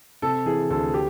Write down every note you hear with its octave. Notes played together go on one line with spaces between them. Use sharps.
C3 A4
E3 G#4
D2 A4
G4